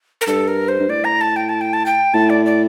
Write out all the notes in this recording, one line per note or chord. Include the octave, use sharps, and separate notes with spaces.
A#4
G2 A4
A#4
C5
G2
A2 D5
A#5
A5
G5
A5
G5
A5
G5
A2 A5
D5
D5